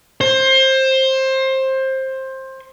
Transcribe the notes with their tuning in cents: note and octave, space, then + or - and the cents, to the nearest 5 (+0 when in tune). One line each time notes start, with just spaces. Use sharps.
C5 +20